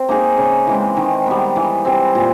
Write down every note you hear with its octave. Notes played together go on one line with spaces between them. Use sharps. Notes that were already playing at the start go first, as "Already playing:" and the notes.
Already playing: C4
A#3 D#4 G#4
C#3
E3 G#3 C4
D#3
G3 B3
E3
G3 C4
A#2